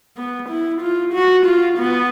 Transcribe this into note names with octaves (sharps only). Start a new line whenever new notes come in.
B3
E4
F4
F#4
F4
B3